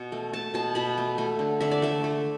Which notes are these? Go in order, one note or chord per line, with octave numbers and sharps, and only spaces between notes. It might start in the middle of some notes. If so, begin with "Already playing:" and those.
Already playing: B2
A3
A3 A5
B2 A5
B2 B5
A3
A3
D3
D3 E5
D5
A3 E5
A3